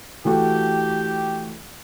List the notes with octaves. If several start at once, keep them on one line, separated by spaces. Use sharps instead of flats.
E3 A3 F#4 G4